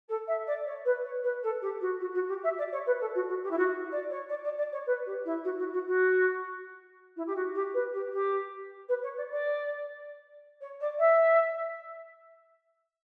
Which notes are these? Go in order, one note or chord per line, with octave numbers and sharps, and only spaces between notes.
A4
E5
D5
C#5
B4
C#5
B4
A4
G4
F#4
F#4
F#4
G4
E5
D5
C#5
B4
A4
F#4
F#4
G4
E4
F#4
D5
C#5
D5
D5
D5
C#5
B4
G4
E4
F#4
F#4
F#4
F#4
E4
G4
F#4
G4
B4
G4
G4
B4
C#5
D5
D5
C#5
D5
E5